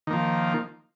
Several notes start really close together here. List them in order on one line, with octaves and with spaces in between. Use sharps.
D#3 A#3 F3